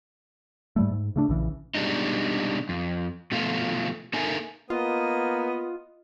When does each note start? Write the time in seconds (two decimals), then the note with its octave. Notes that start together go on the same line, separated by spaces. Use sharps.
0.76 G#2 G3 A3
0.92 G#2
1.16 C#3 A3 D4
1.29 A#1 C#3 E3
1.75 B2 G3 G#3 D4 D#4
2.69 F2
3.32 B2 F3 A3 F4
4.13 A#3 D#4 A4 A#4 E5 G#5
4.70 A#3 B3 F4 D#5